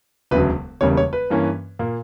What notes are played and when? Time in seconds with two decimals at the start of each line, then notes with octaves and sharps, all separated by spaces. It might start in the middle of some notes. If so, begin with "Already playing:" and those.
0.31 E1 D2 C#3 F#3 B4
0.81 E1 E2 C#3 G3 A#3 C#5
0.97 C#5
1.13 B4
1.30 G2 E3 A#3 C#4
1.79 A#2 A#3